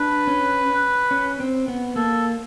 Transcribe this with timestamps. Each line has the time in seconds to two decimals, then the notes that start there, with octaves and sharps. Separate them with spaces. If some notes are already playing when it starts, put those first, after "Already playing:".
Already playing: D4 B4
0.27 C#4
1.11 C#4
1.40 C4
1.68 B3
1.96 A#3 A4